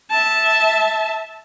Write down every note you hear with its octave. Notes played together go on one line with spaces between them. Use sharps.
E5 A5